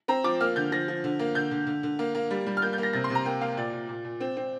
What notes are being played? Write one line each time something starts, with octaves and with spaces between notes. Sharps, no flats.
C4 A#5
F3 D6
A#3 F6
D3 G6
F3 A#6
F3
D3
A#3
D3 G6
D3
D3
D3
A#3
A#3
G3
G3
F6
A#3 G6
G6
A#3
A#6
C3 A#6
C6
C3
A#5
A#3 G5
A#3 F5
A#2 D5
A#2
A#2
A#2
C4
C4